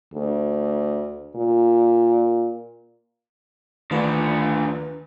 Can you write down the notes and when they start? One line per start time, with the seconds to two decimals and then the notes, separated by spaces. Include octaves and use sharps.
0.14 D2
1.36 A#2
3.91 D2 D#3 F3 D4 B4